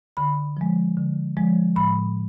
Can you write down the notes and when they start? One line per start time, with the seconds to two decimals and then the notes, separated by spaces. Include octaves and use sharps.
0.17 D3 B5
0.57 F3 G#3
0.97 D3
1.37 F3 G#3
1.76 A2 B5